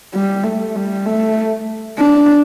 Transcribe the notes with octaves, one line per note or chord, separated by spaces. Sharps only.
G3
A3
G3
A3
D4